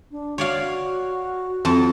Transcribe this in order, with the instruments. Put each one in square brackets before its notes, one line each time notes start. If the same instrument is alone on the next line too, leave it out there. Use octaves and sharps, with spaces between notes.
[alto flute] D4
[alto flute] F#4 [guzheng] C#5 D5 F5
[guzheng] F2 A4 A5